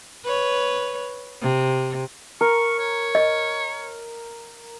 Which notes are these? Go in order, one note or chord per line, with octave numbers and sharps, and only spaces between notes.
B4 C#5
C3
A#4 C#6
C#5
D#5